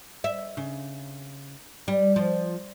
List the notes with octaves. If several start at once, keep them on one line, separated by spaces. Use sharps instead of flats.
E5
C#3
G3
F3